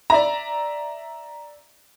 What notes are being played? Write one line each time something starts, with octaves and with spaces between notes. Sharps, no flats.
D5 E5 A#5